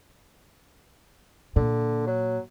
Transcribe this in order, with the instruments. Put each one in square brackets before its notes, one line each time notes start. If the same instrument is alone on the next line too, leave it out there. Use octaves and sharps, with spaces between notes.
[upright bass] A#2 [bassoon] D3
[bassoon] F#3